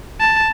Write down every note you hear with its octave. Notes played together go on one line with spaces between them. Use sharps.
A5